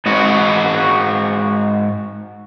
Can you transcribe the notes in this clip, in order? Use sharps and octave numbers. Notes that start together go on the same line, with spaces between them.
G#2 F#4